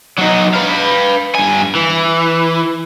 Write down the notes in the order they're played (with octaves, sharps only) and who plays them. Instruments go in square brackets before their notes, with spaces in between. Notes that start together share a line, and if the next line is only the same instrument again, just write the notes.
[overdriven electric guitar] F#3 D#4
B4 F5
G2 G#5
E3